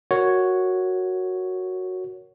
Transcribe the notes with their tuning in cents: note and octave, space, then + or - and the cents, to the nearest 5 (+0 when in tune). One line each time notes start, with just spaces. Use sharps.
F#4 +0 A#4 +0 C#5 +0